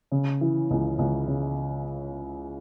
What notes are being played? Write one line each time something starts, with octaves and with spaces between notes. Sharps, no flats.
C#3
E3
C#2
C#2
C#3